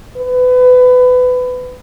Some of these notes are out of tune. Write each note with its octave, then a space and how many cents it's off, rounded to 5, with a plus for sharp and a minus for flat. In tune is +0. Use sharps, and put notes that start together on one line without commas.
B4 +25